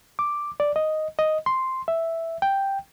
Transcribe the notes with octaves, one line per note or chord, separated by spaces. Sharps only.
D6
D5
D#5
D#5
C6
E5
G5